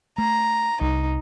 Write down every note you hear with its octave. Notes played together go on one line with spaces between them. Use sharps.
A3 A#5
C2 D#4